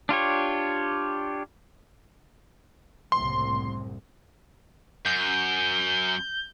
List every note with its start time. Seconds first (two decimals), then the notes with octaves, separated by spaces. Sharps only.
0.09 D4 F4 G4 C#5
3.12 F#1 C2 A2 C6
5.05 F#2 G6